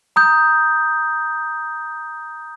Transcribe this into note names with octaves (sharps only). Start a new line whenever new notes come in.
A#5 D#6 G6